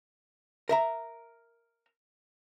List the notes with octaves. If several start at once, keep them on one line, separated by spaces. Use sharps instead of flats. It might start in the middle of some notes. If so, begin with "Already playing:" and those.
A#4 E5 A#5